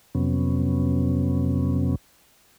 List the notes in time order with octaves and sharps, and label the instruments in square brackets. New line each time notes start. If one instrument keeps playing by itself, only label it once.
[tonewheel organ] F2 C3 F#3 B3 C#4